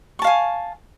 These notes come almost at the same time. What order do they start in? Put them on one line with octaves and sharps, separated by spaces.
C#6 A5 F5 G#5